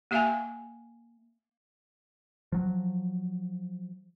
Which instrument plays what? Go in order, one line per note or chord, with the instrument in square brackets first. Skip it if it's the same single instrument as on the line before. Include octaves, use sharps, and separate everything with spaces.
[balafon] A#3 G4 E5 F5 G5 G#5
[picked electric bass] F3 F#3